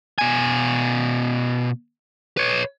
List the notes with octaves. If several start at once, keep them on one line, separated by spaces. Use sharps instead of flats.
B2 G#5
B4 C#5